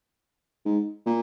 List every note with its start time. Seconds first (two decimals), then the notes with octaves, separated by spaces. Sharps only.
0.65 G#2
1.06 A#2